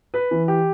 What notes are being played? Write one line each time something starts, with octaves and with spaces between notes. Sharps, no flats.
B4
E3
G4